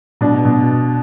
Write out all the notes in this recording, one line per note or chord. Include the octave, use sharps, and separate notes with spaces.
B2 D4
B2